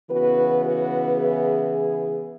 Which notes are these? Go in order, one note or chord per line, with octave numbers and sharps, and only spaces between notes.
C#3 E3 B3 F#4 B4
F#4 B4
E4 G#4